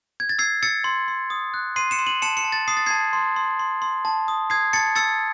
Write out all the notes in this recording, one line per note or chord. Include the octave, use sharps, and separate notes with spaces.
G#6
A6
E6 G#6 C7
E6 A6 C#7
C6
C6
D#6
F#6
C6 C7 D#7
C#7 E7
C6
D#7 F#7
A5 C#7 E7
C#7 E7
A5
A6
D#6 C7
A6
A5 G#6 C7
C6
C6
C6
C6
A5
D#6
D#6 G#6 C7
A5 A6 C#7
E6 A6 C#7